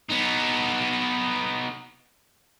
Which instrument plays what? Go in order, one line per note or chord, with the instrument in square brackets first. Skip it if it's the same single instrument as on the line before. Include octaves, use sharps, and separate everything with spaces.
[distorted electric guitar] B3 D#4